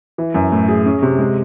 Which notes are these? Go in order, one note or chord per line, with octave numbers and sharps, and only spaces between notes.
E3
F#2
A2
G#4
C#4
C3
G#3